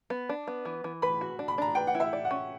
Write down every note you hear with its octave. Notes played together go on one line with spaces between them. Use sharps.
B3
D4
B3
E3
E3
B4 B5
F#4
D4
B5
D4 A#5
B4 G5
F#5
E4
E5
D5
F#5
C#4